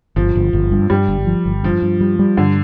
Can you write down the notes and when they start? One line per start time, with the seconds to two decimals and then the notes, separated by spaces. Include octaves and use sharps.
0.16 G1 F3
0.35 G1
0.53 G1
0.72 G2
0.90 G2 G3
1.09 G1
1.27 F3
1.46 G1
1.63 G2 F3
1.82 G2
2.01 G3
2.19 G3
2.37 G2 D3